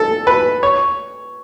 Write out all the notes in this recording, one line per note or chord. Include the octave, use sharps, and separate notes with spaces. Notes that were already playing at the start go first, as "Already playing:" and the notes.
Already playing: A4
B4
C#5